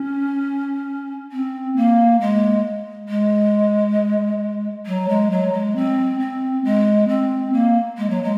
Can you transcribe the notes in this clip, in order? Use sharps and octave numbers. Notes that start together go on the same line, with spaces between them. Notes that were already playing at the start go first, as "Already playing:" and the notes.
Already playing: C#4
C4
A#3
G#3
G#3
F#3
G#3
F#3
G#3
C4
C4
G#3
C4
A#3
G#3
F#3
G#3